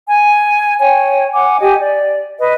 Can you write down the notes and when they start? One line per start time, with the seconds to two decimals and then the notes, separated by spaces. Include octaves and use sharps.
0.10 G#5
0.79 C#5 G5 G#5
1.34 F#5 G#5 D6
1.61 G4 D#5 G5 G#5
1.79 D5
2.40 B4 D#5